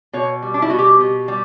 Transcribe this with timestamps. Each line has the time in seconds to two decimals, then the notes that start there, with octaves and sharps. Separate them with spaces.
0.13 B2 C#5
0.42 G3
0.54 D4
0.62 E4
0.70 B2 F#4
0.78 G4
1.00 B2
1.28 G3